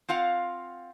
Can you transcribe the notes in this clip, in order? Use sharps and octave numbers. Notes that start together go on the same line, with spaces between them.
C4 F4 F5 F#5